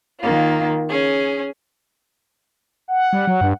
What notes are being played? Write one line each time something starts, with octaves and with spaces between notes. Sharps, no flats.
D#3 A#3 F4
C#4 G#4
F#5
G3
F#3
G2